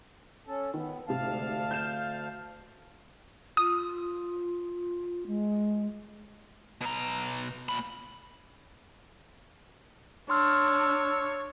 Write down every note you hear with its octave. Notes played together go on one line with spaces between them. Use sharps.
C#4 A4
D#3 B3
D2 G#2 C3 F5 A5
G6 E7
F4 D#6
G#3
B2 A#5
A#2 B5
D4 C#5 C6 E6 F6